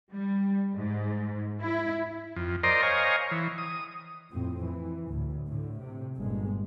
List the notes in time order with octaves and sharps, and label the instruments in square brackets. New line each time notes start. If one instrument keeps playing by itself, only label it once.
[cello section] G3
G#2
E4
[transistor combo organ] F2
A#4 C5 D5 D#5 A#5 C6
C5 C#5 D#5 F5 G#5 A#5
E3
D#6
[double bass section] F2 A2 C4
E3
D2 A2
A2 D3
C3
G1 A#2 G#3